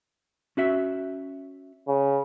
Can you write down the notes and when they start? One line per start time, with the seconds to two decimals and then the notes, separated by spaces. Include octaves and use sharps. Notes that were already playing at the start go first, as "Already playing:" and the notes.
0.57 C#4 F#4 E5
1.88 C#3